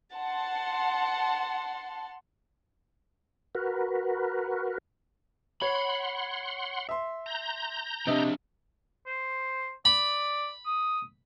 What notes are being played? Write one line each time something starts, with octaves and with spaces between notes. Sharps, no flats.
F#5 A5 C6
F#4 A#4 B4
C#5 F#5 B5 C6
E5 C6
A#5 G6
C3 F3 D4 D#5 E5
C5
D5 B5
D#6